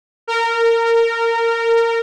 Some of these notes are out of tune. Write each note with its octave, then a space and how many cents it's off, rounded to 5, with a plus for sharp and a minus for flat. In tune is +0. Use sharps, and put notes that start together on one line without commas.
A#4 -20